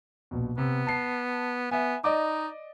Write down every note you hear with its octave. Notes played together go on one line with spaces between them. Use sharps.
A#1 B2
C3 B3
A5 C7
B3 E5 G#5
D#4 D5 D#5 D6